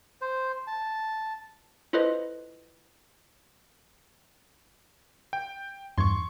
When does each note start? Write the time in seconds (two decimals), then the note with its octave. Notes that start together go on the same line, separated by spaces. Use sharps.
0.21 C5
0.67 A5
1.93 E4 F4 A4 B4 C5 D#5
5.33 G5
5.98 E2 G2 C6 C#6 G#6